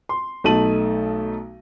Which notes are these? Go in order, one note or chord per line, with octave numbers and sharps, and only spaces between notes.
C6
B1 A3 D#4 A5 D#7 F#7